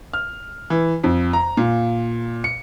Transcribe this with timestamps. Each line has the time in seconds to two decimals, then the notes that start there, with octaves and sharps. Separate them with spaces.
0.13 F6
0.70 E3
1.04 F2
1.33 A#5
1.57 A#2
2.44 C#7